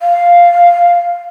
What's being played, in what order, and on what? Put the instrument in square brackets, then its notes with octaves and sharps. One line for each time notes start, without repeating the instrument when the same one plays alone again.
[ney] F5